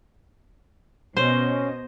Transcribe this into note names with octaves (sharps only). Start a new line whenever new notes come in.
B2 C#4 C5 D#5